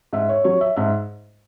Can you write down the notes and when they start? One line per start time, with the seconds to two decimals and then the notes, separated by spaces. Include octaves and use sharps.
0.13 G#2 E5
0.29 C#5
0.44 F#3 C#5
0.61 E5
0.76 G#2 E5